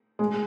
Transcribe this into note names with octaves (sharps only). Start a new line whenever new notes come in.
G#3